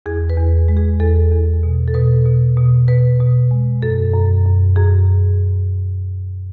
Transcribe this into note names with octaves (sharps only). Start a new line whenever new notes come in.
E2 G#4
B4
E2
G#3
G#4
E2 A4
E2
B2
A4
B2 B4
B2
B2
B2 B4
B2
G#3
F#2 A4
F#2
F#2
F#2 G#4